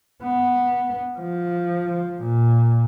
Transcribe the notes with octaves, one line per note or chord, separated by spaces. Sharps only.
B3
F3
A#2